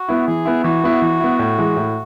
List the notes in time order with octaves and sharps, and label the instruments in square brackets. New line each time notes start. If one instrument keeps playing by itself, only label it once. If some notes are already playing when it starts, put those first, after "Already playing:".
Already playing: [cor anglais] F#4
[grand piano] B3 E4
[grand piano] E3 [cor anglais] G#4
[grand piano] B3 E4
[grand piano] E3 [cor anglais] F#4
[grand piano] B3 E4
E3
B3 E4
A2
E3 G#3
A2